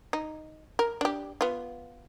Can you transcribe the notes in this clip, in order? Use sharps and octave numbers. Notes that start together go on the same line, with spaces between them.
D#4
A#4
D4 G4
B3 F4